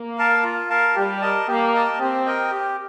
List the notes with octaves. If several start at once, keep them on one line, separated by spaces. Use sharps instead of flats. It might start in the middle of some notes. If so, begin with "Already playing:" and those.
Already playing: A#3
A#4 F5 A5
F4
A#4 F5 A5
G3 G4
A#4 D#5 A5
A#3 G4
A#4 D#5 A5
C4 G4
A#4 D#5 G5
G4